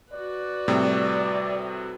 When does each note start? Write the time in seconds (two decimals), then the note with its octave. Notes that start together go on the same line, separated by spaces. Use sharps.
0.13 F#4 B4 D5
0.68 A2 C3 G3